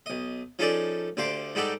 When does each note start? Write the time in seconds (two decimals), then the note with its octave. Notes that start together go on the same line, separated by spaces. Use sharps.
0.06 B1 D#5
0.59 F3 C#4 D#4 G#4 A4 D5
1.17 D2 D3 G4 C5 F5
1.55 G#2 G3 D#4 F#4 G4 A4